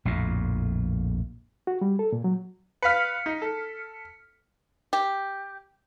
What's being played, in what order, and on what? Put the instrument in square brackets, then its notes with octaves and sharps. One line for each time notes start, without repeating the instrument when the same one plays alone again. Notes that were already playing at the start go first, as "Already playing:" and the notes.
[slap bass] A#1 F2 A2
[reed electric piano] F#4
G3
A4
A#2
F#3
[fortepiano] B4 F5 [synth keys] F6 B6 C#7
[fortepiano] D#4
A4
[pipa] G4